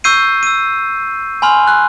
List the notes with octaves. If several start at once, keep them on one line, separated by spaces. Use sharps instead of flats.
C#6 E6 G6 C7 D#7
E6 D#7
G#5 B5 C6 F6
F#6